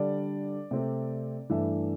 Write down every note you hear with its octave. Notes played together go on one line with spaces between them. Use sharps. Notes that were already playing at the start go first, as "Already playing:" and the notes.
Already playing: D3 G3 D4 D5
C3 A3 C4
G2 E3 A3 D4 E5